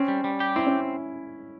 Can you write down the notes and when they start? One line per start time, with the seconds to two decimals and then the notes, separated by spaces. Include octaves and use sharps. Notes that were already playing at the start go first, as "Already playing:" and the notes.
Already playing: C4 C#4
0.08 G3
0.24 G3
0.40 G4
0.56 C4 E4
0.67 C#4